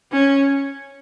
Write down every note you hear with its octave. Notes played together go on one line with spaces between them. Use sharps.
C#4